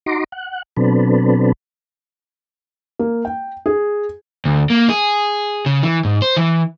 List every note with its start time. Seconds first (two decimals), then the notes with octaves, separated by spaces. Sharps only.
0.06 D#4 F#4 A#5 C6 D6
0.32 F#5
0.77 B2 F#3 C4 D4 A4 B4
2.99 A#3
3.25 G5
3.66 G#4
4.45 D2
4.70 A#3
4.89 G#4
5.66 C#3
5.83 E3
6.05 G#2
6.22 C5
6.37 E3